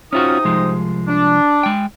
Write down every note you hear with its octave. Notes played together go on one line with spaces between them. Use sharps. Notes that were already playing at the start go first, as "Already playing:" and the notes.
C3 C#4 D#4 F4 F#4 D#6
C2 F3 G#3
D4
G#3 G5